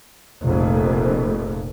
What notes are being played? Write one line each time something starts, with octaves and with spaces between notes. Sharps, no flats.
F1 A#1 F2